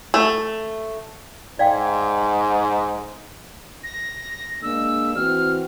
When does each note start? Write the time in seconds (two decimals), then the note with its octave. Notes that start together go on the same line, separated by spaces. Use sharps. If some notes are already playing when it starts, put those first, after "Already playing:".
0.14 A3
1.59 G#2 D5 F5 G5
3.84 A#6
4.62 G#3 A#3 D4 E6
5.15 E3 C4 F#4 F6